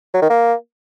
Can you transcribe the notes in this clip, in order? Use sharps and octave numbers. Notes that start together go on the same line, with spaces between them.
F#3
D#3
A#3